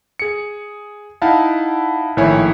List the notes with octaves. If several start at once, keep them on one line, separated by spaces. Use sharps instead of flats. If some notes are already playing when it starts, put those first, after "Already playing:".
G#4 C#7
D#4 E4 F5 F#5 A5
A#1 A2 D#3 E4 C#5 G#5